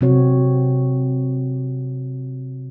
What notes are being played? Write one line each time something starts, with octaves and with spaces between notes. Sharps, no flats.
C3 F#3 C4 F#4 C#5